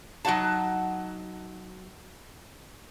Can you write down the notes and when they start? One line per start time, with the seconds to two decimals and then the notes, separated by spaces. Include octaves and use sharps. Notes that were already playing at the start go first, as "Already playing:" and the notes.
0.25 F#3 D#4 F#4 F#5 A5